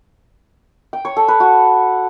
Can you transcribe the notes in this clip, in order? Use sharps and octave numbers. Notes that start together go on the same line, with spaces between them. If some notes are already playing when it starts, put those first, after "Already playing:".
G5
C#5
A4
B4
F#4